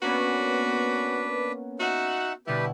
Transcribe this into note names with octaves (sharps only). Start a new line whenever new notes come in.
A#3 B3 C#4 D4 F#4 B4
D#4 F#4 E5 F#5
B2 D3 G3 E4 G4 B4